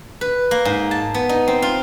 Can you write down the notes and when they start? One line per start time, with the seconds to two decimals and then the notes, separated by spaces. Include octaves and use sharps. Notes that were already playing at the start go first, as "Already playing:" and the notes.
0.21 B4
0.51 A#3
0.65 G#2
0.91 A5
1.14 B3
1.29 D#4
1.48 C4
1.62 F4